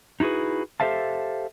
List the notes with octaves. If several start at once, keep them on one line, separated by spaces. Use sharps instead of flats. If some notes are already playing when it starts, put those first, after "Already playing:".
D#4 E4 F#4 G#4 B4
G4 A4 C5 E5 F5 A5